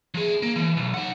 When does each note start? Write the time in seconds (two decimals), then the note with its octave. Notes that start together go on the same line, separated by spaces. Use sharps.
0.14 F3 G#4
0.43 A#3
0.56 E3
0.77 B1
0.94 D#4 F#5